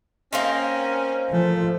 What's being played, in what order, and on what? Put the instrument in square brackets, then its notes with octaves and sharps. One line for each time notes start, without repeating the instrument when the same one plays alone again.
[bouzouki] A#3 C4 D#4 [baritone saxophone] C#4
[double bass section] F3 [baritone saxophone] A3